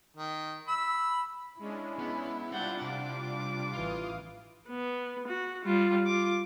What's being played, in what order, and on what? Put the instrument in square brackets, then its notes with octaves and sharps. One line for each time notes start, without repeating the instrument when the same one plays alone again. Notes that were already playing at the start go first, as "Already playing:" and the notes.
[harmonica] D#3
B5 E6
[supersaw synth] G#3 C#4 D4 [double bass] E4
[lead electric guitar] B3
[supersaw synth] G3 D4 F4 [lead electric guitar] C4 D5 [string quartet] F#5 G6 A6
[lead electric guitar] C3 [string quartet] D6
[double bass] A1 E3 [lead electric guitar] F4 [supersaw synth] F5 D#6
[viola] B3
F#4
G3 F4
F4 D6